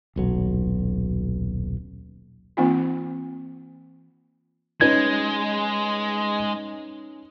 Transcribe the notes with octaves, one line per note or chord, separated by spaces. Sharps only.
D#1 B1 F#3
E3 A#3 C4 D#4 F4
G#3 C#4 D#4 B4 G#6